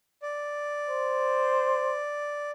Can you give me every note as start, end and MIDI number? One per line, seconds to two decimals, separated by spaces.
0.22 2.51 74
0.89 2.00 72